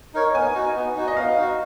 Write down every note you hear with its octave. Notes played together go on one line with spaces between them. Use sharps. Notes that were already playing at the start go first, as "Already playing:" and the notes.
D#4 A#4 C#5
B3 G#5
D#4 F#4
B3
D#4 F#4
D#5
B3 F5
D#4 F#4